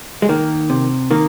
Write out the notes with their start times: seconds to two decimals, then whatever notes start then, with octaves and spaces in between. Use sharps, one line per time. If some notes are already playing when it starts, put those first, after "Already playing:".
0.22 G#3
0.29 D#3 A#3
0.70 C3
1.11 D#3 A#3